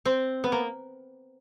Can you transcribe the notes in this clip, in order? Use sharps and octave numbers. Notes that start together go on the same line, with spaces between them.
C4
B3
A#3